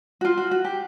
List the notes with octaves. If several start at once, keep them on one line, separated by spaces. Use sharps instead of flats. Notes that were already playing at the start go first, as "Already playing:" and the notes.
F#4
F4
F#4
F#4
G4